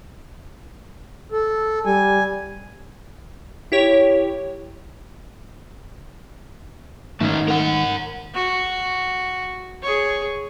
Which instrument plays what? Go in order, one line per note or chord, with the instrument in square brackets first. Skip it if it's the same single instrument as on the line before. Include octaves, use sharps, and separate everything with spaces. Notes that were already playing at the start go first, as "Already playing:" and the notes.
[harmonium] A4
[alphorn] G3 [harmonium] G#5
[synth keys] E4 G4 C#5
[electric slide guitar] G#2 D#3 [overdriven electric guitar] A3 C#4
[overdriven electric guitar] A#4 F#5
[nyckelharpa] F#4
G#4 C#5